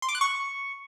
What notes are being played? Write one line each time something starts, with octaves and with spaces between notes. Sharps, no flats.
C6
D6
F#6
C#6